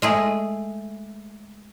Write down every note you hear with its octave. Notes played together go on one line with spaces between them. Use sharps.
G#3 A3 G#4